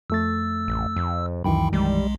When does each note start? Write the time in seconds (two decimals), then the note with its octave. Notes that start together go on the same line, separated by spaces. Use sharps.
0.10 F2 A3 E6 A6
0.68 A1
0.96 F2
1.44 C#2 F#2 D#3 E3 G5 B5
1.73 B1 G3 G#3